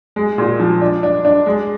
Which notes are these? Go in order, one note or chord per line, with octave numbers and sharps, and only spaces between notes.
G#3
A#2
F3
D4
D4
D4
G#3